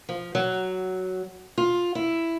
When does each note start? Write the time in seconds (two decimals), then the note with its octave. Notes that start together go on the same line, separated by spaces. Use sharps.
0.09 F3
0.35 F#3
1.58 F4
1.95 E4